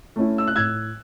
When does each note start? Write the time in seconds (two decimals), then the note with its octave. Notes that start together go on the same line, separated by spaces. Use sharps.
0.16 A3 C#4 E4
0.38 E6
0.47 F#6
0.55 A2 E6 G#6